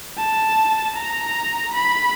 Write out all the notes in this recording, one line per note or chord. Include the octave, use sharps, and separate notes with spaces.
A5
A#5
B5